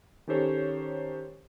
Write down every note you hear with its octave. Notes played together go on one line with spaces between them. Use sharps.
D#3 C#4 G4 A4 C5 C#5